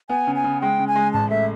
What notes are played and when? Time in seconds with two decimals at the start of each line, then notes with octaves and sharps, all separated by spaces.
0.09 B3 G#5
0.27 C#3
0.35 G#5
0.44 C#3
0.61 G#3 G5
0.79 C#3
0.88 G#5
0.95 G#3
1.13 A1 A5
1.30 A3 E5